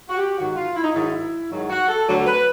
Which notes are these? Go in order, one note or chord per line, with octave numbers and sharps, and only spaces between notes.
F#4
G4
G#2 D#3 F#3 F#4
F4
E4
D#4
G#2 D#3 F#3 E4
G#2 D#3 F#3
F#4
A4
D2 D3 F#3
B4